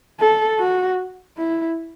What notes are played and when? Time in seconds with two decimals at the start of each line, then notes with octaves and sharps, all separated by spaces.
0.19 A4
0.59 F#4
1.37 E4